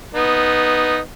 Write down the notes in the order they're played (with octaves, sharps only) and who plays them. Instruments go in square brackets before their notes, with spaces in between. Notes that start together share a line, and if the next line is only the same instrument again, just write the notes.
[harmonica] B3 D#4